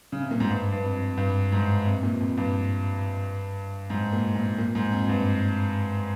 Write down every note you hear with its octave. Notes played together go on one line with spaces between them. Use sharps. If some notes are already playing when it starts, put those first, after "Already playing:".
C#3
C3
A#2
G#2
G2
G2
F2
G2
G#2
C3
A#2
F2
G2
G#2
A#2
A#2
A#2
G#2
F2
G2